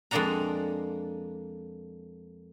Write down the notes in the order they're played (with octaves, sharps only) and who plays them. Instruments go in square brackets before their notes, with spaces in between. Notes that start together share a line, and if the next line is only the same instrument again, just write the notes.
[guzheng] F2 G#3 A#3 D4 F#5 A#5